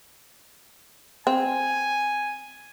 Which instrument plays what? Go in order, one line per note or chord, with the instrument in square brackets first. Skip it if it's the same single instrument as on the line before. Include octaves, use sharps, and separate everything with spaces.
[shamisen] C4 [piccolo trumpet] G#5